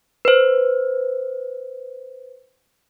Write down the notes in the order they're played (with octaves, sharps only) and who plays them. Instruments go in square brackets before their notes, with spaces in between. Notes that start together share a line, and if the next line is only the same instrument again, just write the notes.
[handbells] B4 C5